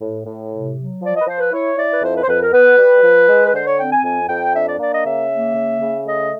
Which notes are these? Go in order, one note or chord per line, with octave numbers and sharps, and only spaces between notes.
A2
A2
C3
F#3
F3 D5
D#5
B4
F3 C5
B4
E4 C#5
E4 D5
B4
F2 C5
B4
C5
F2 B4
A#4
B3 B4
G3
F3
G#3
B4
D3 C5
C#5
C4 G5
G#5
F2 G#5
F2 G5
D4 E5
D5
A#3 D5
D#5
C#3 E5
A#3
C#3
C#3
A3 D#5